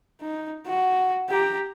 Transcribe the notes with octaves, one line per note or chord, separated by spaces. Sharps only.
D#4
F#4
G4 A#5